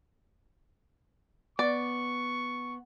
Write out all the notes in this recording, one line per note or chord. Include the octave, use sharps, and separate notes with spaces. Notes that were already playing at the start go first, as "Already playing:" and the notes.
B3 D5 C#6